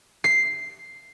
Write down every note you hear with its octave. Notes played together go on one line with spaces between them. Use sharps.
C7